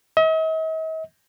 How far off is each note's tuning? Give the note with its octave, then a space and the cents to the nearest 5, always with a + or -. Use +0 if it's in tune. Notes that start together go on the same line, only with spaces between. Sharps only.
D#5 +45